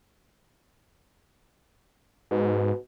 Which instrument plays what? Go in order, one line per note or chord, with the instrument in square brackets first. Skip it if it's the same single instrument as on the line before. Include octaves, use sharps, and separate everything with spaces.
[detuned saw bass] G#2 [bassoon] B2